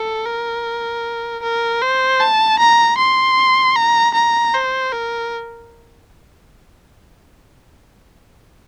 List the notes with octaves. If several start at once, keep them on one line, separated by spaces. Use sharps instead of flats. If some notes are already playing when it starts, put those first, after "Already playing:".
Already playing: A4
A#4
A#4
C5
A5
A#5
C6
A#5
A#5
C5
A#4